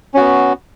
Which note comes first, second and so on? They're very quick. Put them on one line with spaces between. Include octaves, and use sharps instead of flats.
C#4 F#4 B3